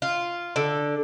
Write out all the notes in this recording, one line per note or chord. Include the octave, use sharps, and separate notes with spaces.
F4
D3